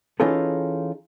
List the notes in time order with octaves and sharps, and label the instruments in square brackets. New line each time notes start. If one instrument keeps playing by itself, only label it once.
[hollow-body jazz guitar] E3 C#4 D#4 F4 G#4 A4